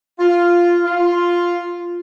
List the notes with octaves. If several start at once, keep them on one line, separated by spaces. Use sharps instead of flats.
F4
F4